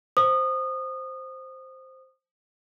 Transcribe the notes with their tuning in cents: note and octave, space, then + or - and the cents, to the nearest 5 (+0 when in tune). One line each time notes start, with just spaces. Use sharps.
C5 +0 D#6 -25